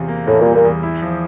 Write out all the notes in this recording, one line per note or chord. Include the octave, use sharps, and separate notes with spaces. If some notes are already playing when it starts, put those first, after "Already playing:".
Already playing: E2 C3 F4
A#3
E2 A2
A#2 G3
A#2
E2
E4
F3